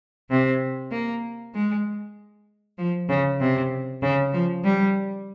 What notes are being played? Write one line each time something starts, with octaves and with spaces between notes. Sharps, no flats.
C3
A#3
G#3
F3
C#3
C3
C#3
F3
G3